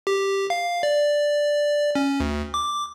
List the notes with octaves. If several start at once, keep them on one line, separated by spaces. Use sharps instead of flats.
G4
F5
D5
C#4
D2
D6